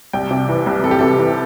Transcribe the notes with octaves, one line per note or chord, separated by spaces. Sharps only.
C2 G5
C3
E3
C2
C2 A4
G4
C3 A4
E3